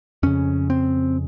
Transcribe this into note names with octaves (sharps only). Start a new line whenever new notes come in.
F2 C#3 C#4
C4